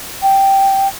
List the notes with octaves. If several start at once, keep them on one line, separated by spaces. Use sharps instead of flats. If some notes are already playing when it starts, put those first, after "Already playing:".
G5